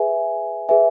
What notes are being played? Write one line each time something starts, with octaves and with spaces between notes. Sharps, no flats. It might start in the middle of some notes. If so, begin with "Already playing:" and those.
Already playing: G#4 B4 E5 G#5
G#4 B4 E5 G#5